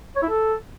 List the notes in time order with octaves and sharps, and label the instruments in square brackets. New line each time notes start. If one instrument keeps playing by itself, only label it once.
[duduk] C#5
E4
A4